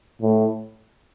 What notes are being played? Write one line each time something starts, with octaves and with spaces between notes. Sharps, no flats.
A2